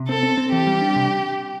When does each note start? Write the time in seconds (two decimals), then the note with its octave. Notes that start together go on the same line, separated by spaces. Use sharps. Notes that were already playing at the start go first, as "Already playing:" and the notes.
Already playing: C3
0.09 C4 A4
0.23 C4
0.37 C4
0.52 E3 G4
0.67 G3
0.81 D4
0.96 C3